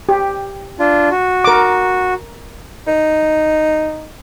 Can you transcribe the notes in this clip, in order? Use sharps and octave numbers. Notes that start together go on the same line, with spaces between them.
G4
D4 F4
F#4
A#4 D6
D#4